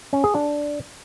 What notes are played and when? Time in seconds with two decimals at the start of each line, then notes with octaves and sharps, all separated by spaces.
0.13 C#4
0.24 G#4
0.35 D4